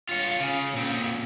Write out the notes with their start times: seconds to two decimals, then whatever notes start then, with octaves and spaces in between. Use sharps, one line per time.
0.09 F4 C#5
0.40 C#3
0.74 A#2 C4